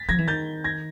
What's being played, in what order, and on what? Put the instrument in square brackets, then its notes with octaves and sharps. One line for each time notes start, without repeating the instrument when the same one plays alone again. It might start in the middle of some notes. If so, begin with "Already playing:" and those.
Already playing: [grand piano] A6 B6
[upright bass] F3 [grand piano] G#6 A#6
[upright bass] E3
[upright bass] D#3 [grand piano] G6 A6
[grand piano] G#6 A#6